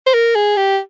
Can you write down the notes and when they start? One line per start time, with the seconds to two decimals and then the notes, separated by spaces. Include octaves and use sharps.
0.07 C5
0.14 A#4
0.35 G#4
0.57 G4